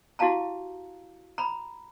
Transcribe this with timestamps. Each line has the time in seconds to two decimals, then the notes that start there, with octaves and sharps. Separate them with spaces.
0.19 E4 F#4 G4 F5 A5 A#5
1.38 A#5 B5